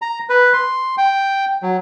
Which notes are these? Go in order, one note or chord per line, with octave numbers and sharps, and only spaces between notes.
A#5
B4
C6
G5
F#3